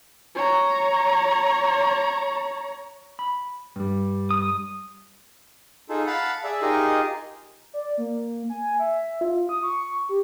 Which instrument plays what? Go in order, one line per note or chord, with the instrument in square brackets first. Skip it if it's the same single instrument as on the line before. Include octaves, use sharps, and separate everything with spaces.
[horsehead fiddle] C#5 A#5
[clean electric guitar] B5
G2 G3
[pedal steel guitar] D#6
[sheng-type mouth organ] D#4 F4 G#4 A4
F5 F#5 A5 B5
G#4 D5 E5
D#4 F4 G4 G#4 A#4 D#5
[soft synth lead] D5
A#3
G#5
E5
F4
D#6
C#6
G4